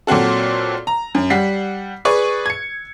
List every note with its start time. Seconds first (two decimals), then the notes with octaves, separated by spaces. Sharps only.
0.07 A#2 F#3 C4 F#4 A4
0.87 A#5
1.15 F#2
1.30 G3 F#5 B6 C7
2.05 G#4 B4 D5 C#6
2.46 G#6 C#7